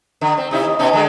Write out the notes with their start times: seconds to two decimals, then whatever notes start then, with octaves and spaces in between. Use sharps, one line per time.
0.21 D3
0.38 C4
0.51 C3 D#4 E4
0.65 D#2
0.79 B2 C#4 D#4
0.93 D3 D#3 G#3